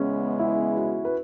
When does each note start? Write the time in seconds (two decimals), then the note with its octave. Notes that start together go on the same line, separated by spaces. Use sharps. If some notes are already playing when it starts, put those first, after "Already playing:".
Already playing: E2 C#3 G#3 B3 C#4
0.39 E4
0.76 F#4
1.05 B4